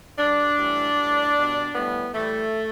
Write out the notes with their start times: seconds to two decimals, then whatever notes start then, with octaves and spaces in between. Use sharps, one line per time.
0.18 G2 D3 G3 D4
0.57 A2 E3 G3
0.96 A2 G3
1.35 B2 G3
1.73 A2 G3 B3
2.13 A2 E3 G3 A3